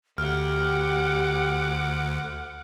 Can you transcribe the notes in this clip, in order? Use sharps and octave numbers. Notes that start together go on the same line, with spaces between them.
D2 G4 F#5 D6 F6